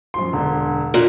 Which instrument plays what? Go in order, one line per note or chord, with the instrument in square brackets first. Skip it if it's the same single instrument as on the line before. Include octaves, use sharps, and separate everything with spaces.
[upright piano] F#2 F3 C6
E1 D3
[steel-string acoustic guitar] A#2